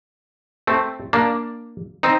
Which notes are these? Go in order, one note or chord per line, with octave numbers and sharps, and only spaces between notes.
A3 C4
A#3 D4
C4 D#4